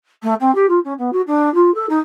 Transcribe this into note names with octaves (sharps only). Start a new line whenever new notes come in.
A3
C4
G4
F4
C#4
B3
F#4
D4
F4
A4
D#4